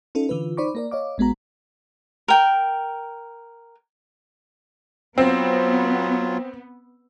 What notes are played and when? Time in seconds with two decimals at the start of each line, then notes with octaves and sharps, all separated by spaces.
0.15 C#4 D#4 F4 A4
0.29 D3 E3 F4 B4
0.57 D#4 C5 D5 B5 C#6 D6
0.75 A#3 A#4 D5
0.91 C#5 D#5 F5 D6
1.18 A1 G#3 B3 F#4 A#5
2.28 A#4 G5
5.18 F#3 B3 C4 F4